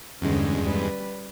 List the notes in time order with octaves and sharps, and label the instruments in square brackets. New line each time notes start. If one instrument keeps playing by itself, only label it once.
[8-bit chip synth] E2 G2 G#3 [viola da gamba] D3 C#4
[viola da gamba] G3 B4